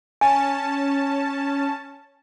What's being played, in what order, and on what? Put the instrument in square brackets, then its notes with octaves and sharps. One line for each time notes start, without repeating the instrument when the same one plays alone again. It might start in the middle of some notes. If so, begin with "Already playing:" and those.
[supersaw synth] C#4 A5 [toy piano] G#5